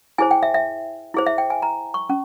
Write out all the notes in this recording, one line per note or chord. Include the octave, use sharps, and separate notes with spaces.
E4 G#4 C5 G#5
G5
E5
E5
E4 G#4 C5
E5
G5
G#5
A#5
C#6
C#4